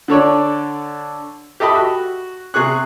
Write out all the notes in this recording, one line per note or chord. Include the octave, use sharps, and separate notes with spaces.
D3 A4 C#5 D5
G4 A4 D#5 E5 B5
F#4
C3 G#4 C#6 F#6